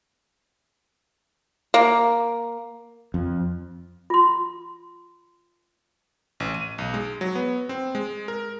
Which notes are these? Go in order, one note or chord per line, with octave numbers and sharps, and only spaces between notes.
A#3
F2
F4 C6
A1
D#7
B1
G#3
F#3
B3
C4
G#3
A#4